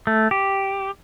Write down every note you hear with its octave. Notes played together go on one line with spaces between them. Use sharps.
A3
G4